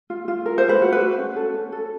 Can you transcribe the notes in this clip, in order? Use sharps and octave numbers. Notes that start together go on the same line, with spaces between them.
F4
F4
A#4
C5
F4
B4
F#4
B4
F#4
C#4
A4
C#4
A4